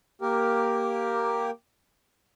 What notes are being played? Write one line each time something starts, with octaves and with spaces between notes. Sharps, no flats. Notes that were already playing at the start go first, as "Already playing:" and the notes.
A#3 G4 A#4